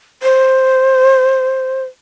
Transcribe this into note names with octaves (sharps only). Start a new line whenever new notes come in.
C5